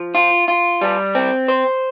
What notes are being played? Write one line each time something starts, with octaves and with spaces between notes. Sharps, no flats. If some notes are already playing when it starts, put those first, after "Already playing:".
Already playing: F3
F4
F4
G3
C4
C5